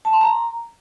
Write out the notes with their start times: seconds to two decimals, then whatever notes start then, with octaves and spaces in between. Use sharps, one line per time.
0.05 A5
0.13 C6
0.21 A#5